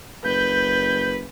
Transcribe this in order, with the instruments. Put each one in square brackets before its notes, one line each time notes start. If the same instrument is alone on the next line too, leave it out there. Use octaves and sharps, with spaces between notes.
[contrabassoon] F#1 [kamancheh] B4 [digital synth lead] G6